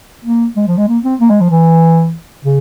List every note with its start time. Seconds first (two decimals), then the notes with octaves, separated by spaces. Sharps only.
0.25 A#3
0.56 G#3
0.67 F3
0.77 G#3
0.88 A#3
1.04 C4
1.20 A#3
1.30 G#3
1.40 F3
1.50 E3
2.44 C#3